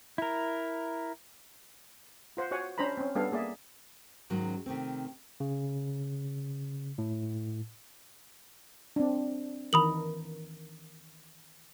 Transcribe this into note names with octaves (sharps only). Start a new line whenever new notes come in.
E4 A#4
F4 C5 F#5
F#4 C#5 F#5 G#5
C#4 D4 C5 A#5 B5
C4 C#4
G3 B3 D4 A4 F5
A#3 G#4 D5 E5
G#2 D#3 F#3 G#3 C#4
C3 D#3 A3 C4
C#3
A2
C4 D4
D#3 E3 A#4 B5 D#6 F#7